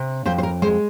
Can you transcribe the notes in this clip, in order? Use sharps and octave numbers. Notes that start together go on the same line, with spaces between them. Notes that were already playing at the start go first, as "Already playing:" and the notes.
Already playing: C3
F2 C5
C5
A#4
G#3 C5